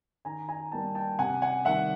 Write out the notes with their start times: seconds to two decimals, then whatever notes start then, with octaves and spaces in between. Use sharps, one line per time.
0.25 D#3 G#5 A#5
0.48 G#5 A#5
0.72 G3 A#3 D#4 G5 A5
0.95 G5 A5
1.19 C3 F#5 G#5
1.42 F#5 G#5
1.65 D#3 G3 E5 F#5